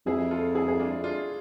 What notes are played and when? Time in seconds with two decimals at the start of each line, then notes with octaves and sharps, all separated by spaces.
0.06 F2 E4 G#4
0.31 F4 A4
0.55 E4 G#4
0.68 G#4
0.80 D4 F4
1.04 D4 F4